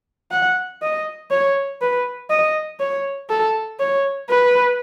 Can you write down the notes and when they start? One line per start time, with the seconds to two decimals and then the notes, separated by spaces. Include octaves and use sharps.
0.31 F#5
0.82 D#5
1.31 C#5
1.81 B4
2.30 D#5
2.80 C#5
3.29 A4
3.79 C#5
4.30 B4